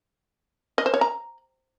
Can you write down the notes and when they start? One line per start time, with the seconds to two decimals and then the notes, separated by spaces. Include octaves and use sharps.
0.78 D#5
0.86 C5
0.94 C#5
1.01 A#5